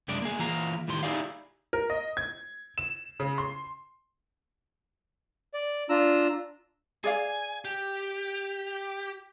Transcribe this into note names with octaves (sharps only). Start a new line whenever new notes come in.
C2 F#2 G#3 D4 D5
A#3 G#4
E3 A#3 F4 F5 A#5
C2 A2 D#3 G4 C6
D#4 E4 G4 G#4 D5 F5
A#4
D#5
G#6
E7
C#3
C6
D5
D4 F4 A#5 E6
G#4 D5 F5 G#5
G4